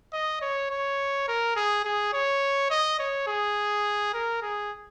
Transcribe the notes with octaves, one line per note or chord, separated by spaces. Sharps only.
D#5
C#5
C#5
A#4
G#4
G#4
C#5
D#5
C#5
G#4
A#4
G#4